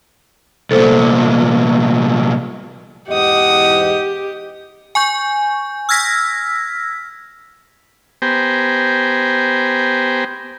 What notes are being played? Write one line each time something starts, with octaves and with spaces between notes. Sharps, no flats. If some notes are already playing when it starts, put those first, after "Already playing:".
C2 A#2 A4 C5
E2 G#2 G4 D#5 F#5 D#6
G#5 C#6 G6
E6 F6 G#6 A#6 B6
B3 G4 C5 G5 G#5 A#5